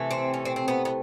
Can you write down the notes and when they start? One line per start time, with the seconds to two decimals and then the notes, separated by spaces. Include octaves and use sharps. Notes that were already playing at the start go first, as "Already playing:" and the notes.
Already playing: C3 E3 A3
0.11 C4
0.34 C#4
0.45 C4
0.56 C4
0.68 B3
0.85 B3